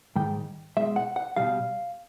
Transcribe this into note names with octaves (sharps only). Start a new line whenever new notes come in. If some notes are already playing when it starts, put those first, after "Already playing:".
G#2 D#3 G3 G5
B2 G#3 E5
F#5
F#5
B2 G3 F5